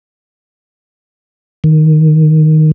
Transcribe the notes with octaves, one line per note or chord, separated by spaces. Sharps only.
D#3